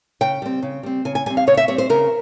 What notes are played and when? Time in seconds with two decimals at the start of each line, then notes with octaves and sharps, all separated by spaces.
0.21 C#3 G5
0.42 G3 C4
0.62 C#3
0.83 G3 C4
1.05 C#3 G#5
1.15 G#5
1.26 G3 C4 G#5
1.37 F5
1.47 C#3 C#5
1.57 E5
1.68 G3 C4 C#5
1.78 C5
1.89 C#3 A#4